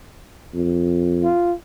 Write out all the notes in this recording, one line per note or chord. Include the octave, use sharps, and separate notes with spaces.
F2
F4